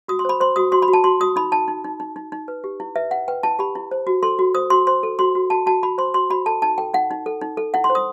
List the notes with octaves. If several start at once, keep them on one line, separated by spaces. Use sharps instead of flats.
F#4 D#6
C6
C5 B5
C5 C6
F#4 D#6
F#4 C6
B5
F#4
A5
F#4 C6
F#4 D#6
D#4 B5
D#4 A5
D#4
D#4
D#4
D#4
D#4
B4
G4
E4
B4 E5
E4 F#5
B4 G5
E4 A5
G4 B5
E4
C5
F#4
A4 C6
F#4
C5 D#6
F#4 C6
C5 C6
A4
F#4 C6
F#4
F#4 A5
F#4 A5
F#4 B5
C5 C6
F#4 C6
F#4 B5
A4 A5
D#4 A5
A4 G5
D#4 F#5
D#4
A4
D#4
A4
E4 F#5
C6
C5
D#6